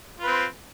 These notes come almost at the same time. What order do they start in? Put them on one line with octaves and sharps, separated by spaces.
F4 B4 C4